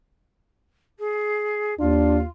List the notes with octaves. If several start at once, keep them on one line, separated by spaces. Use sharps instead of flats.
G#4
D#2 D4 F4